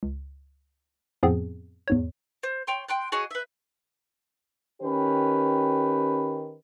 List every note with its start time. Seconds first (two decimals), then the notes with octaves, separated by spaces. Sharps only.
0.03 C#2
1.23 F2 A2 F3 B3 C4 G#4
1.88 E2 G#2 C#5
2.43 C5
2.67 C#5 G5 C6
2.88 G5 C6 F#6
3.12 F#4 G#4 C#5 D#5
3.31 B4 E5
4.82 D#3 C#4 G4 B4